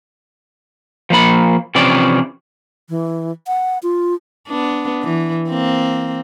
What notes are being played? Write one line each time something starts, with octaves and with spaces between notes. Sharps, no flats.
F3 A#3 B5
C3 E3 F3 C#4 D5
E3
F#5
F4
B3 D4
E3
A#3 C4